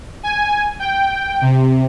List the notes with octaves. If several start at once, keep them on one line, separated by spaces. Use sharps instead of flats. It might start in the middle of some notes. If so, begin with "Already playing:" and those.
G#5
G5
C3